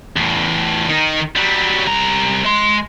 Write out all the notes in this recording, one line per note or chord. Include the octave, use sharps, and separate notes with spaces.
E2 A2
D#3 D#4
F#3 G3
C2 A#5
G#3 C6